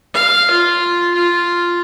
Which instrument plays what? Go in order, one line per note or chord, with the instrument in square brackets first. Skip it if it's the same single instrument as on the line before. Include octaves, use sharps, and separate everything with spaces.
[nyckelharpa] F5
F4
F4